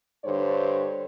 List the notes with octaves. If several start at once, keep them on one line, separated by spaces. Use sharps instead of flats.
G2 D3 A4 C5 C#5